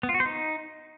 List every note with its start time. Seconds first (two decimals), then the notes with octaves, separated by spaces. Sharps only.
0.03 B3
0.09 F4
0.14 F#4
0.20 C5
0.26 D#4